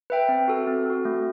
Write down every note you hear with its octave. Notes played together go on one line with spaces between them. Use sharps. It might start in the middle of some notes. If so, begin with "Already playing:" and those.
B4 E5 G5
C4
F#4 A4
C4
F#4 A4
A3